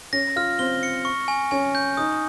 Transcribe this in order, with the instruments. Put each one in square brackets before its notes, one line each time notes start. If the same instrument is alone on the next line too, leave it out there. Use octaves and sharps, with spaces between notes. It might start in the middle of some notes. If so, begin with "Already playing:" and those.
[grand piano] C#4 [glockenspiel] A#6
[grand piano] F4 [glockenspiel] F6
[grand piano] C4 [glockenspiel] G7
[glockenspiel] C#7
C#6
G#5
[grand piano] C#4 [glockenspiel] G#5
[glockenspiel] G6
[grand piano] D#4 [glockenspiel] D#6